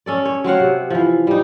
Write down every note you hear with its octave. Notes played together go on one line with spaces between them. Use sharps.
C#4 A4 D5
C#5
F#3 C4 F5 F#5
C3
E3 F3
G3 D#4